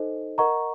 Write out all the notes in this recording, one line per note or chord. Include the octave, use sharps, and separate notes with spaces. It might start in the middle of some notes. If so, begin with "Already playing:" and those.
Already playing: D#4 A4 C5 D#5
A#4 D#5 F#5 A#5 C#6